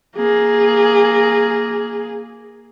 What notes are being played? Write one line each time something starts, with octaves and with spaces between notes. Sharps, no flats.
A#3 G#4